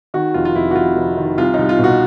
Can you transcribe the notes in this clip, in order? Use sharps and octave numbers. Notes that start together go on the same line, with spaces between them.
D#3 F#4
F1 F4
F4
F1 E4
F#4
F1 F4
F1
D#3
C2 F4
C2 D#4
F4
B2
F#4